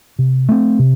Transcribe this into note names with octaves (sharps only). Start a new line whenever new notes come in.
C3
A3 C4
C3